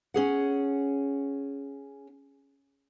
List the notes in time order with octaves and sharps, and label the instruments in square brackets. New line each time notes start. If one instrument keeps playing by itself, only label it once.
[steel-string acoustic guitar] C#4 G#4 F#5